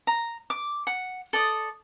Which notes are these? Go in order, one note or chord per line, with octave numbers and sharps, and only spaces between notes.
A#5
D6
F#5
A4 D5 D#6